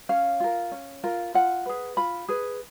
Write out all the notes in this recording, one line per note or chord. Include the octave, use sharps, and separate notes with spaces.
C#4 F5
F4 A#4
C#4
F4 A#4
F4 F#5
G#4 B4
F4 B5
G#4 B4